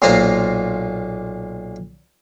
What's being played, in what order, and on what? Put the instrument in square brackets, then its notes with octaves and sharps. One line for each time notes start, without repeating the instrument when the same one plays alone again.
[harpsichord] B1 A#2 A#3 F4 C5 A#5